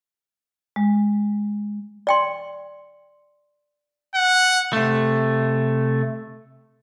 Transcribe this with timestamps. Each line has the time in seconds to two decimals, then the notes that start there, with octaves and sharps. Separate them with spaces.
0.76 G#3
2.07 D5 G5 C6
4.15 F#5
4.73 C3 A3